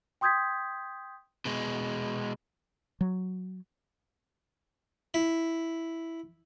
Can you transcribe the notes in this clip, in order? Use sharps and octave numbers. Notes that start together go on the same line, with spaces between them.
G5 C6 D#6 G6 G#6 B6
B2 G#3
F#3
E4